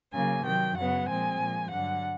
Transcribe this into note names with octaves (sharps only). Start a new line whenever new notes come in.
C#3 F#3 A#3 G#5
C3 D#3 F#3 G5
F#2 C#3 F#3 B3 F#5
A#2 F3 G#3 C4 G#5
A#2 F3 G#3
G2 D3 F#3 F#5